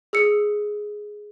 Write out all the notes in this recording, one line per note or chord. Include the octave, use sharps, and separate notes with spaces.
G#4 E6 C#7